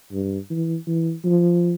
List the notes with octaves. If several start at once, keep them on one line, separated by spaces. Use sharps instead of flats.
G2
E3
E3
F3